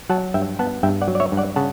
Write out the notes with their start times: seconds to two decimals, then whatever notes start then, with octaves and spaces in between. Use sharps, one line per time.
0.10 F#3 F#5 A5
0.34 G2 E5 G5
0.59 B3 F#5 A5
0.83 G2 E5 G5
1.02 D5 F#5
1.08 F#3
1.15 D5
1.20 C#5 E5
1.32 G2
1.37 D5 F#5
1.56 C#3 F#5 A5